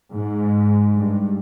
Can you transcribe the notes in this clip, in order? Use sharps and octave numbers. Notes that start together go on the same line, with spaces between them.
G#2
G2